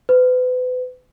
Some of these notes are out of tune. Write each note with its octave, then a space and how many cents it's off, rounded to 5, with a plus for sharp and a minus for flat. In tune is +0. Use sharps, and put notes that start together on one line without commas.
B4 +35